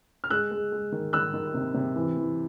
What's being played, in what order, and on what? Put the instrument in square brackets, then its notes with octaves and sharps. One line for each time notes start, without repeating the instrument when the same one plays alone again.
[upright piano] F6
G#3 E6 F#6
G#3
G#3
D#3
D#3 E6 F#6
D#3
C3
C3
E3
E3